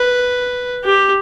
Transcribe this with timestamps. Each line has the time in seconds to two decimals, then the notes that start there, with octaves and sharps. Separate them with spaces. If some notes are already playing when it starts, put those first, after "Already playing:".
Already playing: B4
0.84 G4